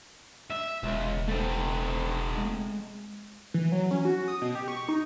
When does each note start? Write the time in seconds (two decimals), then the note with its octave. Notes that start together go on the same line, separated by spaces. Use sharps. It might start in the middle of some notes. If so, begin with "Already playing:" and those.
0.51 E5
0.83 E1 C#2
1.28 A3 C4
2.38 G#3
3.54 E3
3.72 F#3
3.91 C#4
4.05 F#4
4.28 D#6
4.42 B2
4.55 G4
4.68 C#6
4.89 D#4